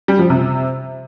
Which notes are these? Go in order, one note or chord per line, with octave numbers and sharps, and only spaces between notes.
G3
F3
C3